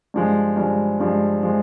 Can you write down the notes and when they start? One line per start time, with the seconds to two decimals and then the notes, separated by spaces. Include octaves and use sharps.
0.14 G2 F3 G#3
0.56 G2 F3 G#3
1.00 G2 F3 G#3
1.43 F3 G#3